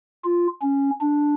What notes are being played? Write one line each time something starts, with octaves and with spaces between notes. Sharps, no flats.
F4
C#4
D4